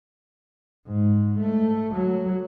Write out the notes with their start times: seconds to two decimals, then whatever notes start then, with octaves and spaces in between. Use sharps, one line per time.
0.87 G#2
1.38 A3
1.94 F#3